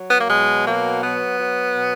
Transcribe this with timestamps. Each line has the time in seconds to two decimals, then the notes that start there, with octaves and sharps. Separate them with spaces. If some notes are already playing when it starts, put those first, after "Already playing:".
Already playing: F#3
0.09 B3
0.19 A#3
0.28 B2 G#3
0.66 F#3 A#3
1.02 F#3 B3
1.39 F#3
1.76 B2